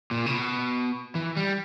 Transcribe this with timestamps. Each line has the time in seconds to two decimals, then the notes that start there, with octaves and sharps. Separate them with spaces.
0.11 A#2
0.26 C#3
0.31 B2
1.15 E3
1.37 G3